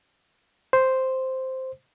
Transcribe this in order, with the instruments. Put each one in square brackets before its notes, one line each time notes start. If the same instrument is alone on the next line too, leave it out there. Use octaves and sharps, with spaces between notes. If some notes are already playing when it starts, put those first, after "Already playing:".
[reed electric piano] C5